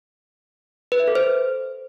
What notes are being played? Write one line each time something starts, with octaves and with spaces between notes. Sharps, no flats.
B4
E5
A4
C5